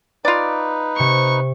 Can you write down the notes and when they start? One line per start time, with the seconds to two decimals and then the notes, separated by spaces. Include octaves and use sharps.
0.25 D#4 F4 B4 D5
0.96 C3 C#6 C#7